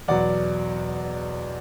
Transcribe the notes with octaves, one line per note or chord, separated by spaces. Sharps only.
E2 B2 F#3 D5 F#5